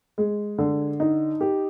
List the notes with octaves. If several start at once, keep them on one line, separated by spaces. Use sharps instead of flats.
G#3
D3
D#4
G4